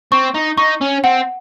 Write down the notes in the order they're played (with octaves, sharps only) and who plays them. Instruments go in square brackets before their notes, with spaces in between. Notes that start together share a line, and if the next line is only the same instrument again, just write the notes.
[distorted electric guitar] C4 [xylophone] C#6
[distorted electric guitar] D#4
[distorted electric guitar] D#4 [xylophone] C#6
[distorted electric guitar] C#4
[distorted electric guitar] C4 [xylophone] F#5